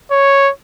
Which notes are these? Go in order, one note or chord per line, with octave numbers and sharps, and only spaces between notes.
C#5